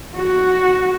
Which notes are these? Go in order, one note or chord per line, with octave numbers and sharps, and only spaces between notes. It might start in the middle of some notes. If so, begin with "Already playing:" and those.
F#4